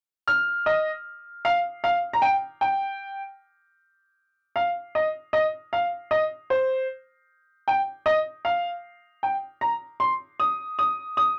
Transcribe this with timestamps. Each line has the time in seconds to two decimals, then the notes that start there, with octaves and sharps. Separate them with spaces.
0.28 F6
0.66 D#5
1.45 F5
1.84 F5
2.13 A#5
2.22 G5
2.61 G5
4.56 F5
4.95 D#5
5.33 D#5
5.73 F5
6.11 D#5
6.50 C5
7.68 G5
8.06 D#5
8.45 F5
9.23 G5
9.61 A#5
10.00 C6
10.40 D#6
10.79 D#6
11.17 D#6